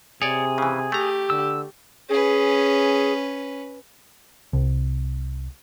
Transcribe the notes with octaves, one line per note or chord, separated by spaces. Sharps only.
C3 G#4 C#5 D5
C#3 E3
A3 G4 A#5
D3 E6
C#4 G#4 B4
C2